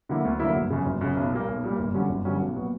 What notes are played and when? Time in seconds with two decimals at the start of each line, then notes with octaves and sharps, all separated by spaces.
0.09 D3 F#3 A#3 E4
0.25 D2
0.40 D3 F#3 A#3 E4
0.56 G1
0.70 F#2 C#3
0.86 G1
1.01 F#2 C#3
1.17 B1
1.32 A#2 G3 A#3
1.48 B1
1.64 A#2 G3 A#3
1.79 G1
1.94 G2 D3 F#3 C#4
2.09 G1
2.25 G2 D3 F#3 C#4
2.41 B1
2.56 A#2 F#3 B3 F#4